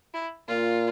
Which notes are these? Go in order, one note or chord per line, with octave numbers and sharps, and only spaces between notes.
E4
A#2 F4